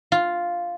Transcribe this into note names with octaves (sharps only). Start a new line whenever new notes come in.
F4